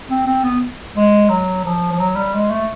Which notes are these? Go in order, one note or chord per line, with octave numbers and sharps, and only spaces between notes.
C4
C4
B3
G#3
F#3
F3
F3
F#3
G3
G#3
A3